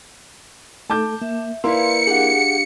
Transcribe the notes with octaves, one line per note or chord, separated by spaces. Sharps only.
A3 A4 A5 D6 G6
A#3 E5
A#3 E4 B4 D5 F5 C6 C#7
D4 G4 G#4 F5 F#5